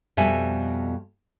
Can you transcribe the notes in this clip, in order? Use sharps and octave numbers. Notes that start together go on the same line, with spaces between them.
F2 B2 G3 E5 G#5